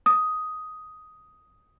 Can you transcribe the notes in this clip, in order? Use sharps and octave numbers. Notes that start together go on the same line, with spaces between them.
D#6